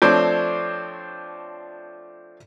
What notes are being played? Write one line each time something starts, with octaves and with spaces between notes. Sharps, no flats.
F3 A3 C4 D4 C5 C#5